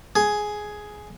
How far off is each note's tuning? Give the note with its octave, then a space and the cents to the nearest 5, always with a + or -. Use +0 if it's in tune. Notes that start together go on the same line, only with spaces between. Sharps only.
G#4 +10